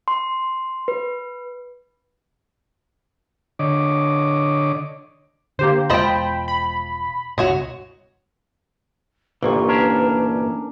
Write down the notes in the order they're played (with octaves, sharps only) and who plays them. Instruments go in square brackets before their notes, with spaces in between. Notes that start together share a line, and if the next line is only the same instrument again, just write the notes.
[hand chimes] C6
B4
[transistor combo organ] D3 C#5 D#5 D6
[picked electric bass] D3 [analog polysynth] A#3 G4 C5
[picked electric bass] E1 B2 G#3 [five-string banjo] F3 C5 D#5 [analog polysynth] G5 B5
[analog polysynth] B5
[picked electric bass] C#2 G2 B2 [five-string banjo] F#4 C#5 D#5
[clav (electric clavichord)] G1 C2 A#2 [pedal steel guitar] E3 A#3 C#6 [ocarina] B4
[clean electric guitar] C#4 D4 A#4